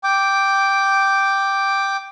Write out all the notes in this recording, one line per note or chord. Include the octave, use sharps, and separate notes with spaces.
G5 D6